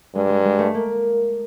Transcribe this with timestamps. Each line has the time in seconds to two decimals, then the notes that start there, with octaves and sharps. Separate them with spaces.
0.15 G2 G#3
0.29 G#3
0.45 G#3
0.59 A3
0.74 A#3